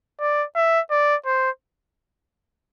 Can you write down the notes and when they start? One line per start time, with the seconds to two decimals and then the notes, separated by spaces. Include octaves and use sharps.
0.20 D5
0.56 E5
0.91 D5
1.26 C5